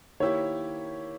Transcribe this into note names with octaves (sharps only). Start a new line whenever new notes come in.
D#3 A#3 E4 G4 C#5